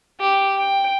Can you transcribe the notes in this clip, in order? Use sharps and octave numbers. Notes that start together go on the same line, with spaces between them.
G4
G5